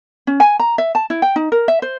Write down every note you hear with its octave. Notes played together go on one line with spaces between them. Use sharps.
C#4
G#5
A#5
E5
A5
E4
G5
D#4
A#4
E5
C5